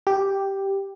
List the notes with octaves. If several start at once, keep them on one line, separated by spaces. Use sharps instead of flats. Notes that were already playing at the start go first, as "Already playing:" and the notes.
G4